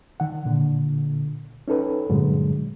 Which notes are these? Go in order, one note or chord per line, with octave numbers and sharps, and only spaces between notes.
D#3 F#5
A#2 D3
C#4 D#4 A4 B4
G2 A#2 D3 F#3 G#3